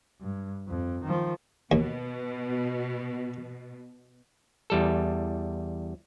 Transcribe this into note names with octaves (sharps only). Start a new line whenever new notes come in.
G2
F2
D#3 F3
D#2 B2
E2 G3 A4